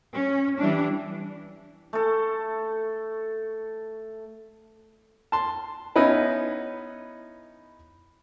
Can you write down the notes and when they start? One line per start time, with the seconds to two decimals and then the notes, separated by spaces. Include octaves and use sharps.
0.14 C#4
0.59 E3 G3 D4
1.93 A3 A4
5.32 A5 C6
5.96 B3 C#4 D#4 E4 B4